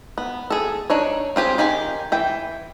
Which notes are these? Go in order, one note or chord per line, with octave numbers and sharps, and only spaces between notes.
B3
G#4 A4
D4 D#4 C#5
C4 F4 G4 G#4
D#3 G4 G5 G#5
E3 G5